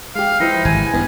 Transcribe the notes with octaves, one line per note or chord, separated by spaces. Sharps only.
G#3 G4 F5
F3 D#4 E4 B4 C5
G#1 G#5
G2 B3